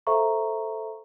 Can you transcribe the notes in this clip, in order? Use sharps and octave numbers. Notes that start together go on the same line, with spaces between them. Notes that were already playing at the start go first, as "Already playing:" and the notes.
A4 C5 E5 F5 A#5 C#6